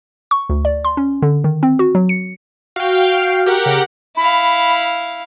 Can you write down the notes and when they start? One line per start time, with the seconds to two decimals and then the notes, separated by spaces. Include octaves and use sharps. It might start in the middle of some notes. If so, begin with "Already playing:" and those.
0.31 C#6
0.50 D2
0.65 D5
0.85 C6
0.97 C#4
1.22 D3
1.44 D#3
1.63 C4
1.79 F#4
1.95 F#3
2.09 C#7
2.76 F#4 F5 G5
3.46 G4 A#4 F#5
3.66 C#3
4.17 E4 F5 B5